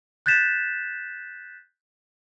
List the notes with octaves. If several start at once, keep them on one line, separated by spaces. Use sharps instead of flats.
F#6 G6 A6 B6 E7